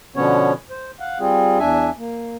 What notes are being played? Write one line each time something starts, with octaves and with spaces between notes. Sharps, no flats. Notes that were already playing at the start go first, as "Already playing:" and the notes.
B2 D3 F3 B3 C#4 C#5
C5
F5 F#5
G3 C4 F4 G#4
E2 D4 E5 G#5
A#3